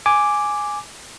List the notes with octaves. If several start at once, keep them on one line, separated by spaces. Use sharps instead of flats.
G#5 D6